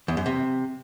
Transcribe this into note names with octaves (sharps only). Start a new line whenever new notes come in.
E2
F#2
C3